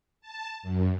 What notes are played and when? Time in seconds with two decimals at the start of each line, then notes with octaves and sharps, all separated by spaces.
0.21 A5
0.63 F#2